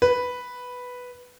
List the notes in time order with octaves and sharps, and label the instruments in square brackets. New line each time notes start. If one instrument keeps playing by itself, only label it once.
[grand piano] B4